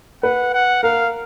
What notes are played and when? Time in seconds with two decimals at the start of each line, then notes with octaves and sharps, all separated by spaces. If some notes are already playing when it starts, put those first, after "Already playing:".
0.23 B4 F#5
0.53 F#5
0.83 A#4 F5